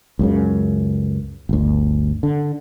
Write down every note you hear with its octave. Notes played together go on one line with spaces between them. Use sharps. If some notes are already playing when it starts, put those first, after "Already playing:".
C#2 F#2 C#3
G1 D2
D3